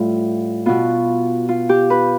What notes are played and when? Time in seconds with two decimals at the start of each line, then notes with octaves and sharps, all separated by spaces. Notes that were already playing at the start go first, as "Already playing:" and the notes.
Already playing: A2 G3 F4
0.66 B2 B3 F4
1.49 F4
1.69 G4
1.90 B4